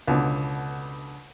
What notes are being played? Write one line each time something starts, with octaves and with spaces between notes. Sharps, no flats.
C#2 B2 D3